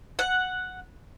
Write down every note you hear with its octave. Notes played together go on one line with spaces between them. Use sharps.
F#5